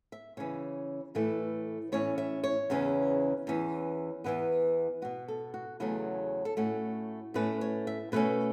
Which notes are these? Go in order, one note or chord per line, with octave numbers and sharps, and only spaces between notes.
E5
C#3 E3 C#4 C#5
A2 E3 A3 B4
A2 E3 C#4 C#5
E5
C#5
E2 C#3 E3 C#4
E2 E3 C#4
E2 E3 B3 B4
B2 B3 F#4
A4
F#4
E2 C#3 F#3 A3 C#4 E4
A4
A2 A3 C#4 F#4
A2 A3 C#4 B4
C#5
E5
B2 A3 C#4 B4